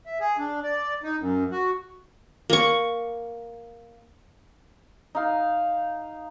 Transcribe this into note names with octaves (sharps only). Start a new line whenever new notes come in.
E5
G#4
D4
D5
D#4
F#2
F#4
A#3 C#6
D#4 F5